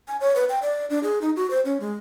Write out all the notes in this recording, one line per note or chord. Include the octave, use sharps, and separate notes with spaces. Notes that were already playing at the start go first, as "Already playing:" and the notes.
G#5
C#5
B4
G5
D5
D4
G#4
D#4
F#4
C5
C#4
G#3